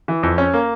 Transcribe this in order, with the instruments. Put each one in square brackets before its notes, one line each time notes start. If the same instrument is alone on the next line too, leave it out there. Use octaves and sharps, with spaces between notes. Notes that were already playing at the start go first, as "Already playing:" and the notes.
[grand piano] E3
F2
C#4
A#3